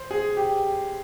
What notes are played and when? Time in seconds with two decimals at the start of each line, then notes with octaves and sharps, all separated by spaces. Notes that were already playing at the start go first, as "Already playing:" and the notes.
Already playing: C5
0.11 G#4
0.37 G4